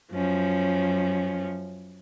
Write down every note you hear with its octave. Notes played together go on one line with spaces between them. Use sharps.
F#2 F3 C#4